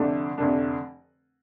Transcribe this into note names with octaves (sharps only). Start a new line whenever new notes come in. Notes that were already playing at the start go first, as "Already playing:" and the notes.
Already playing: F1 F2 D3 A3 D4
F1 F2 D3 A3 D4